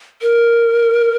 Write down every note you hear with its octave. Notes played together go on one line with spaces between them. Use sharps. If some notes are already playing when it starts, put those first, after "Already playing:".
A#4